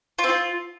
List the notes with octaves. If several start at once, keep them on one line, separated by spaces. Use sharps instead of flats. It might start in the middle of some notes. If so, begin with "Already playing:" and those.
F4
C4
F4